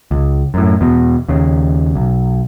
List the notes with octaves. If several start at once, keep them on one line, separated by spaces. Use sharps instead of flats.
C#2
F#2 A2
E2 B2
D#2 C#3
B1